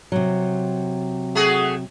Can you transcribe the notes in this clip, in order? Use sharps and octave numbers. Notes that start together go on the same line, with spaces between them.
C3 F#3
A3 F#4 G#4